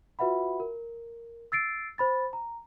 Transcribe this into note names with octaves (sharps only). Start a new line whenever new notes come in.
F4 F#4 B4 E5 F#5 B5
A#4
E6 A6 C7 D7
C5 B5 A6
A#5